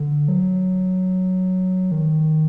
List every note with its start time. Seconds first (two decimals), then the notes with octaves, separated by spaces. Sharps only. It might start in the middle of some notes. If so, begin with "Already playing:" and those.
Already playing: D3
0.28 F#3
1.92 D#3